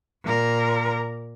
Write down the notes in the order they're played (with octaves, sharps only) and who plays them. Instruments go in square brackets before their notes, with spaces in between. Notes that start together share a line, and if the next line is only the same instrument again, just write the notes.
[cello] A#2 A#4